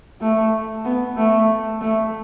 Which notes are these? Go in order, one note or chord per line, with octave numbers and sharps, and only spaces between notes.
A3
B3
A3
A3